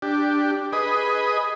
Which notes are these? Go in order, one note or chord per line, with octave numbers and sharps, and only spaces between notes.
D4 G4
G#4 B4 D#5